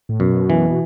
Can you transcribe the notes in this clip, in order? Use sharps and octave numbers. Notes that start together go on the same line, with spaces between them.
A2
F#2 B2
E3
B2